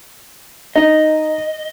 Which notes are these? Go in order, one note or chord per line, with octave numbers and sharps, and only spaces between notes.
D#4 D#5